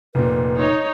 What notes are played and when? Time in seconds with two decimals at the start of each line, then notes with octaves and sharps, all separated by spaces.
0.15 F1 A#2 B4
0.58 D#4 C#5